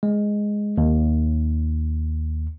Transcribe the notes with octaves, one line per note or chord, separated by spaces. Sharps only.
G#3
D#2